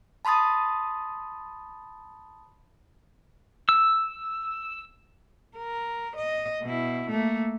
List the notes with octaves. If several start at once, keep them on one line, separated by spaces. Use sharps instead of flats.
A5 B5 C6 D#6 A6
E6
A#4
D#5
B2 E4
A3 A#3